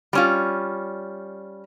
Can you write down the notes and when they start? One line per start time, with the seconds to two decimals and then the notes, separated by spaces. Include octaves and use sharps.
0.13 G3 C#4 F4